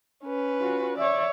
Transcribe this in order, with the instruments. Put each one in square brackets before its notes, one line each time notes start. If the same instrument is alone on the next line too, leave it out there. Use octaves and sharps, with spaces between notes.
[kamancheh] C#4 B4
[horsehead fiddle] F4 F#4
[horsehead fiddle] C#5 E5 [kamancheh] D5